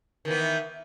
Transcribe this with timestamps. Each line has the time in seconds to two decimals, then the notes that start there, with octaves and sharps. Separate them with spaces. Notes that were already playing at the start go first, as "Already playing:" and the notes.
0.25 D#3
0.28 E3
0.31 B3